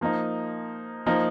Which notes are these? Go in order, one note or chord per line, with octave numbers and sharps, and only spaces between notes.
F3 A#3 D#4
F3 A#3 D#4